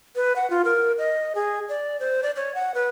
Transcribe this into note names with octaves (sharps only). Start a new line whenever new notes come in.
B4
F#5
F4
A#4
D#5
G#4
D5
C5
D5
C#5
F#5
B4